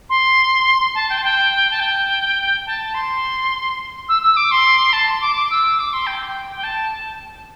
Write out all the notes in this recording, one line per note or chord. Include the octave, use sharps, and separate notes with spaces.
C6
A5
G5
A5
G5
A5
G5
A5
C6
E6
E6
D6
C6
A5
C6
D6
D6
E6
D6
C6
G5
G5
G5
A5